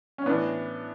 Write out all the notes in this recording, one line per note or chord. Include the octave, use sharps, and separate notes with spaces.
C#4
A2 E3 B3 D4